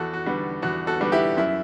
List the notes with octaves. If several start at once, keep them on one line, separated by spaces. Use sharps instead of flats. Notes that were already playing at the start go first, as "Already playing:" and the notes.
Already playing: E2 F#4 A4
F#4
D3 G3 B3
E2 F#4
F#4 A4
D3 G3 B3
E4 G4
F#2 E4